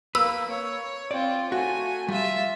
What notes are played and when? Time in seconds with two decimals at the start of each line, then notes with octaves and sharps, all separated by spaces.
0.15 A#3 B4 E6
0.50 C#5
1.11 C4 F4 D5
1.52 A3 F#4 G#5
2.08 G3 F4 E5